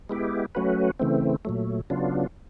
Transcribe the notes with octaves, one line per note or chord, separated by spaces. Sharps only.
G#3 B3 E4 G4
F#3 A3 C#4 F#4 B4
C#3 E3 A3 C4
A#2 F#3 A3
C#3 F#3 B3 D4 F4